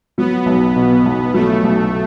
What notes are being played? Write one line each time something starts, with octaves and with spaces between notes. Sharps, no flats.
F#3 B3
B1
B2
B1
F#3 A3
B1